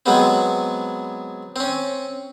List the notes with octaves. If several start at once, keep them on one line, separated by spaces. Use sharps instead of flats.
F#3 G#3 B3 C4
C4 C#4